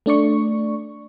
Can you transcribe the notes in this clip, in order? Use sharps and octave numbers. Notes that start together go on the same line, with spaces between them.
A3 D4 D5 C#6